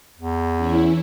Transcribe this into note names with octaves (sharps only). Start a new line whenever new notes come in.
E2
E3 C#4 E4